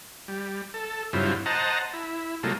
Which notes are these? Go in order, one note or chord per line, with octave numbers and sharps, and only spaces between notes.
G3
A4
G2 C#3 F#3 C4 E4 F4
C5 D#5 F#5 A5 A#5
E4
C3 F#3 G#3 A#3 F4 A4